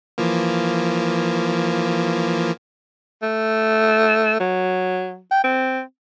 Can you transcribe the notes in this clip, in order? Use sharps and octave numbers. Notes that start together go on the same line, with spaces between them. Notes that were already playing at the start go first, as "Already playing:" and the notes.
E3 F3 A#3
A3
F#3
G5
C4